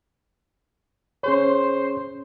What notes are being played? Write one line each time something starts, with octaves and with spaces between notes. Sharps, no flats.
C#4 G#4 C5 C#5